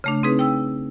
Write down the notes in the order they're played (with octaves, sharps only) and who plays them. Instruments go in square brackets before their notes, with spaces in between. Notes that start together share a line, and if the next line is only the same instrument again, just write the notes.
[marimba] C#3 A3 D4
C4 D#4 G#4 B4
G5 E6